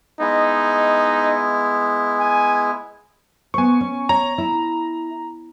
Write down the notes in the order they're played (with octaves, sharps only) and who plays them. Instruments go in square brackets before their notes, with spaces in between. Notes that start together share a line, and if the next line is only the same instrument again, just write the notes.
[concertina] G#3 B3 E4 [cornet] D#4
[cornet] G#5
[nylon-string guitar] B3 C5 [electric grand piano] G#5 C#6
[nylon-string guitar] C#4
[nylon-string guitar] C#5 [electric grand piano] A#5
[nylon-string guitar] E4